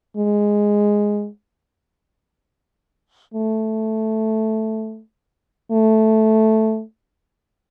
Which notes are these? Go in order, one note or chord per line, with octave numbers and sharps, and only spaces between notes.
G#3
A3
A3